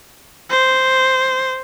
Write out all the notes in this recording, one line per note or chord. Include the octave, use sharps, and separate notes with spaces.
C5